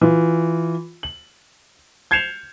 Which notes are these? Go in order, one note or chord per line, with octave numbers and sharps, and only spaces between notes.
E3 F4
F#7
G6 G#6 C7 C#7 E7 F7